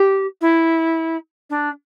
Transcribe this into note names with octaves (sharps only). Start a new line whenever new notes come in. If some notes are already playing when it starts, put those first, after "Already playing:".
Already playing: G4
E4
D4